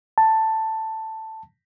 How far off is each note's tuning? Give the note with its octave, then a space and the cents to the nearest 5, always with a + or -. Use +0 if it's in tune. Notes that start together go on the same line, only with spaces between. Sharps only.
A5 +10